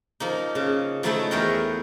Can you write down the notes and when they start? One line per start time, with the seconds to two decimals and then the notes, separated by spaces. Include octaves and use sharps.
0.20 F3 A#3 D#4
0.55 C#3
1.03 F3 F#3 A3 D#4 E4 A4
1.31 E2 A3 G#4 A#4 C#5 G5